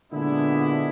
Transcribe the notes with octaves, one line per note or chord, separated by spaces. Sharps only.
A#2 D3 G#3 B3 D4 E4